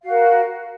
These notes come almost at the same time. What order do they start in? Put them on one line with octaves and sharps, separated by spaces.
F5 F#4 A#4